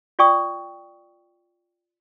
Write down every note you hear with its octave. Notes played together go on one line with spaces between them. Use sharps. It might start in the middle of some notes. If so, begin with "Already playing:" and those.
F4 D5 G5 C#6 D#6